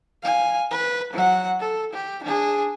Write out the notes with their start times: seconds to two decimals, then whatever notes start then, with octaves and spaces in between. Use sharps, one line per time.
0.23 F5 G#5
0.71 B4
1.13 F#3 F#5
1.60 A4
1.93 G4
2.24 D4 G#4